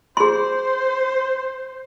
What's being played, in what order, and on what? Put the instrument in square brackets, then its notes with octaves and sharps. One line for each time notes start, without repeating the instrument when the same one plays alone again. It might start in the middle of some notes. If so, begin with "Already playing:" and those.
[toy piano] G#4 C6 [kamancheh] C5